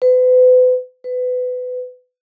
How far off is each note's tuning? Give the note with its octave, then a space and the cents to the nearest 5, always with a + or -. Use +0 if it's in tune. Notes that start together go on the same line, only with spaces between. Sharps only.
B4 +40
B4 +25